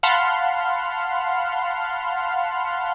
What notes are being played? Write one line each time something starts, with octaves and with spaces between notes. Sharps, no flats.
F5 F#5 A5 B5 C6 F6